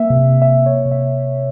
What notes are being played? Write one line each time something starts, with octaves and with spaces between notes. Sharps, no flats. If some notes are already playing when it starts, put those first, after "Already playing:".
Already playing: A#3 E5
C3
C3
E5
C3
A#3 C#5
C3
E5